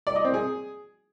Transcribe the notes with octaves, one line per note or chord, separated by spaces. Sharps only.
D5
D#5
C4
G#4